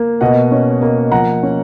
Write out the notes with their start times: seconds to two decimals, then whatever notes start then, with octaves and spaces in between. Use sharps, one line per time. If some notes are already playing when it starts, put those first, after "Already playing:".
Already playing: A#3
0.21 B2 D#5 F#5
0.51 C#4
0.82 A#3
1.11 F3 F#5 A#5
1.43 C#4